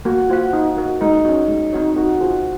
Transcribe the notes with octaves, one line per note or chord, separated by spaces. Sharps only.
A#3 F#4
F4 C5 F#5
D#4
F#4 A#4
G#3 D#4
C#4 F#4
G#3
C4 D#4 F#4 C#5
D#4 F#4
F4 G#4 C5